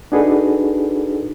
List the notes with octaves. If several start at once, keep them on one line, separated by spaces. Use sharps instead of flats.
D4 D#4 F#4 G#4 A4 B4